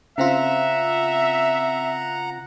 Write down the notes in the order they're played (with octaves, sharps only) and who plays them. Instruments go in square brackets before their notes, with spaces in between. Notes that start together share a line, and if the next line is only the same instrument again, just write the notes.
[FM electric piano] C#3 C4 F4 [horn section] E5 [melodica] F#5 A#5